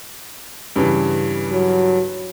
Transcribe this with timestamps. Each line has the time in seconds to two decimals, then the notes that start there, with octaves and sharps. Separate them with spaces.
0.76 G2 C#3 E3
1.51 F#3